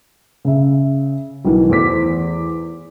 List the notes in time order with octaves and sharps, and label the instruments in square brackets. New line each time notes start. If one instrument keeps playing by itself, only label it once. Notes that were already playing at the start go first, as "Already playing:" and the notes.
[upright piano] C#3 E5
B1 D#3 E3
E2 A3 C5 D6 B6